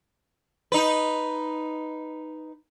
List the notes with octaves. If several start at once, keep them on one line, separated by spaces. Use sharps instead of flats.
D#4 B4